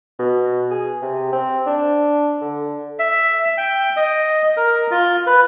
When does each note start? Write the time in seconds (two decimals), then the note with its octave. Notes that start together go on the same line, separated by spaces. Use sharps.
0.19 B2
0.71 G#4
1.02 C3
1.32 C4
1.66 D4
2.41 D3
2.99 E5
3.58 G5
3.97 D#5
4.57 A#4
4.91 F4
5.27 B4